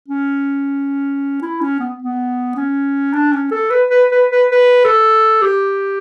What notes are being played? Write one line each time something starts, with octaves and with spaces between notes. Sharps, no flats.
C#4
E4
C#4
B3
B3
C#4
D4
C#4
A4
B4
B4
B4
B4
B4
A4
G4